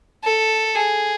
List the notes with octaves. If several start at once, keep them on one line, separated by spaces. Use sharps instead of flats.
A4
G#4